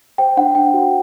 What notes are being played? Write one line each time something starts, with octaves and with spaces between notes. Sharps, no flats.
C5 G5
D4 F#5
D4 G5
F#4